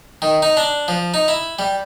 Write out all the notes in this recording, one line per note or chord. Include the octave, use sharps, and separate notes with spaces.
D#3
D#4
D4
F3
D#4
E4
G3